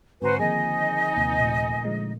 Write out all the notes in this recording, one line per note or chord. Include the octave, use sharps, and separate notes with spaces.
G#2 D3 C4 F#4 B4 C5 G#5 A#5
D#3 F3 A#3 D#4 G#4 D#5 G#5
D#2 C3 A#3
A#2 A3
D3 F3 G#3